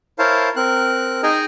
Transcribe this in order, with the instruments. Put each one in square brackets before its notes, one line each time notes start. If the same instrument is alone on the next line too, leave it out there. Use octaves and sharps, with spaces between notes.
[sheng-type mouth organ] E4 A#4 C5 C#5 F5 A5
C4 A#4 F#6
D#4 G#4 D#5 G5 G#5 A#5